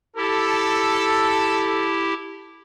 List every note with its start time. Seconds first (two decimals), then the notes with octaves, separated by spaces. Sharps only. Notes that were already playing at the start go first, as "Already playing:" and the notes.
0.16 E4 G4 A4